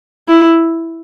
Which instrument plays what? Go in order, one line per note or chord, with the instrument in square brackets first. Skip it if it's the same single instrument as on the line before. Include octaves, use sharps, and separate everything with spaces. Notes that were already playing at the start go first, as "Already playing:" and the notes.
[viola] E4